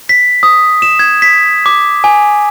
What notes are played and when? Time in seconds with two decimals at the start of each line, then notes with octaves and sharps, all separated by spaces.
0.09 B6
0.43 D#6
0.82 E7
0.99 G#6
1.22 B6
1.66 D6
2.04 G#5